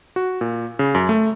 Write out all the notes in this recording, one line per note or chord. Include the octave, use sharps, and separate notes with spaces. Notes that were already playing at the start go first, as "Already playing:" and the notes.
F#4
A#2
C#3
F#2
A3